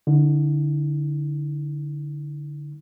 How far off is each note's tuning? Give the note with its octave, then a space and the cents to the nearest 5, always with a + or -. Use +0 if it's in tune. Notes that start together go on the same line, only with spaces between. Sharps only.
D3 +0 E4 -35